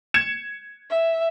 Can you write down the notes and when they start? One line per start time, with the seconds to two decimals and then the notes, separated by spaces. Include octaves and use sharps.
0.14 G#6 C#7 E7
0.90 E5